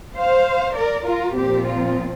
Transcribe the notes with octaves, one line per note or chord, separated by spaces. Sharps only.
C5 F5
A#4 D5
F4 A#4
A#2 F3 C4 G4
F4